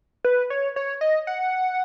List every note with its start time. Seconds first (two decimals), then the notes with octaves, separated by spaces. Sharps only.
0.24 B4
0.50 C#5
0.76 C#5
1.01 D#5
1.27 F#5